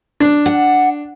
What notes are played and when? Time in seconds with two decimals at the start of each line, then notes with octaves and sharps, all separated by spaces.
0.20 D4
0.46 F#5